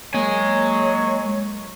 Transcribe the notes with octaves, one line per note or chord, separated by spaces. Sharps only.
F#3 G#3 A#3 C#5 G#5